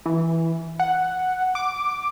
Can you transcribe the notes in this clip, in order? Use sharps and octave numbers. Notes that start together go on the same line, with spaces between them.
E3
F#5
D6